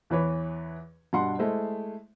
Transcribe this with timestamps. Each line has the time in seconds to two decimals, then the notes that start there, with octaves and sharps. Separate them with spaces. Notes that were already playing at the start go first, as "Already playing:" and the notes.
0.10 E2 E3 B4 C#5
1.13 G2 B2 F#5 C6
1.39 G#3 A3 E4 C5